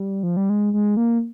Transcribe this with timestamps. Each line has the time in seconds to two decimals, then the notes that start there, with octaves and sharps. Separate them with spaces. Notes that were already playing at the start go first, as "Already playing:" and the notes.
Already playing: G3
0.23 F3
0.37 G3
0.49 G#3
0.73 G#3
0.97 A#3